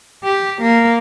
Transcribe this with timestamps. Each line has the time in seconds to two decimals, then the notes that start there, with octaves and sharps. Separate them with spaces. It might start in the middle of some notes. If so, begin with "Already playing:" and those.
0.24 G4
0.61 A#3